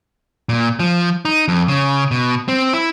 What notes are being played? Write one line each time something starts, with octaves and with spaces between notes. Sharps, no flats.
A#2
F3
D#4
F2
C#3
B2
C4
E4